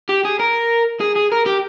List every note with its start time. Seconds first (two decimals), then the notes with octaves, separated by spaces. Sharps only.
0.09 G4
0.25 G#4
0.40 A#4
1.00 G#4
1.15 G#4
1.32 A#4
1.46 G4